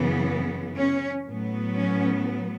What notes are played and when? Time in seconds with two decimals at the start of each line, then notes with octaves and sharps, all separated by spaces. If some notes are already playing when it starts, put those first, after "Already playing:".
Already playing: F#2 C#3 E3 B3
0.77 C#4
1.26 A2 F#3 B3
1.75 C#4